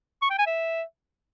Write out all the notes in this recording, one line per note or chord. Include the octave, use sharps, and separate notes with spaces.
C#6
G5
G#5
E5